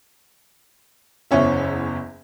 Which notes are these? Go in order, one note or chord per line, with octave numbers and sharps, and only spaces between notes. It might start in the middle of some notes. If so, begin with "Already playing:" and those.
F#1 E2 C#4 E5